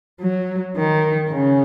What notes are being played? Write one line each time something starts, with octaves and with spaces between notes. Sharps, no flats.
F#3
D#3
C#3